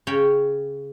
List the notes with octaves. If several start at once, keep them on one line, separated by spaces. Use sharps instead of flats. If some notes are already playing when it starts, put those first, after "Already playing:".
C#3 C#5 G5